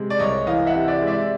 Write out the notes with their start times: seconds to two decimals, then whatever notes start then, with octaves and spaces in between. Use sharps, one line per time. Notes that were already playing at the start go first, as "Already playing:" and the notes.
Already playing: C3 G#3
0.10 D5
0.19 C2 C#5 D#5
0.46 E3 D#5 F5
0.67 E5 F#5
0.74 C3
0.88 D5 E5
1.01 G#3
1.07 D5 E5